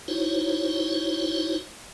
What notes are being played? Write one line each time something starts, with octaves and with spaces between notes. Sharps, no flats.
D#4 E4 F#4 C5 C#5